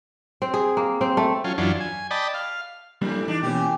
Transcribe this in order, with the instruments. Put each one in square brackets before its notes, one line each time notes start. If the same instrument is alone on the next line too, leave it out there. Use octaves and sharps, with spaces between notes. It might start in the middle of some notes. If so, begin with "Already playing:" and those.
[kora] C4
G#4
A#3
C4
A3
[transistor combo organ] F#3 C#4 F4
F#2 E3 F#3 D4 F4
G#5
D5 D#5 G5 A5 B5
F5
[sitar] F2 A2 [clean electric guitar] G3 A#3 D4
[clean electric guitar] E3 D#4 [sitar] D4
[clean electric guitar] B2 A#3 C#4 [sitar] E3 G4